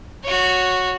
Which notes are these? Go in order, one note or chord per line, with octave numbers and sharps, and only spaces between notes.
F#4 C#5